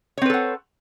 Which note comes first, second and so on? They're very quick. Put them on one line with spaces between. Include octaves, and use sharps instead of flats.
C#5 C4 B4 A4 F#5